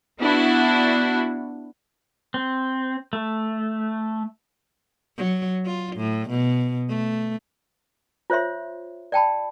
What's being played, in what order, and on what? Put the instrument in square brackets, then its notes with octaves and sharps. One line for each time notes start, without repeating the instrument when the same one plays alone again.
[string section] B3 D4 E4 F#4
[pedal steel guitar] C4
A3
[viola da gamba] F#3
F4
A2
B2
A3
[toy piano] F4 C5 C#5 E5 C6
D5 G5 A5 B5